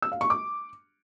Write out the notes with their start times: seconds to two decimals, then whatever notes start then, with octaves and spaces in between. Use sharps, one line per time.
0.02 E6
0.12 F5
0.21 C#6
0.30 D6